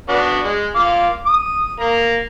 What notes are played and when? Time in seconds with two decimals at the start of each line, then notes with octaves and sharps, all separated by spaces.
0.09 B3 D4 F#4
0.44 G#3
0.76 F4 F5 D6
1.26 D#6
1.80 A#3 A#5